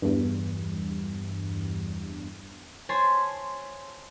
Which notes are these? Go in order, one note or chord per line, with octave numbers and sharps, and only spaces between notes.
E2 G2
C5 C#5 G#5 A5 C6 B6